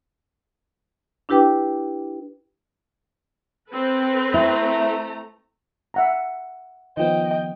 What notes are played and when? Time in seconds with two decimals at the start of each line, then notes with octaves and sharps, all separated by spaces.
1.29 D4 E4 G4 B4 G5 D6
3.71 C4 A4 B4
4.34 A3 E4 A#5
5.94 E5 F#5 A#5
6.97 D#3 F3 B3 D#5 G5